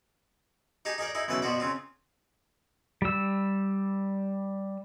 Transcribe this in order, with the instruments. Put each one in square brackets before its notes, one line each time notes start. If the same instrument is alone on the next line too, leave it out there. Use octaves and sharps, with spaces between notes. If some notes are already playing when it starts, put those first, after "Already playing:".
[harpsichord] D#4 G4 G#4 A5
D#4 G#4 A#4 D5
D#4 E4 G#4
B1 C#3 E3 B4 E5 A5
B2 F3 F#4 D5
C#3 C4 F4
[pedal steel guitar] G3 E6